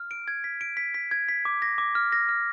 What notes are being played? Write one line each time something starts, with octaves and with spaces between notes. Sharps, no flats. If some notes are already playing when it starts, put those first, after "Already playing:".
Already playing: F6
D7
G#6
B6
D7
B6
B6
G#6
B6
D6
A#6
D6
F6
A#6
F6